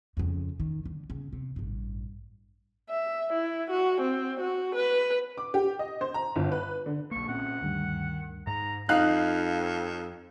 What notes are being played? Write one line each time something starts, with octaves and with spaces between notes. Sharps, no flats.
F2 C#3
D#3
D3
C#3
C3
A1 G2
E5
E4
F#4
C4
F#4
B4
D6
G4
D#5
C5
A#5
G1
B4
D3
B1 A#3 C#6
A#2 C4 C#4 F#5
D2 G2 D#3
G#2 A#5
F2 D#4 F5 F#6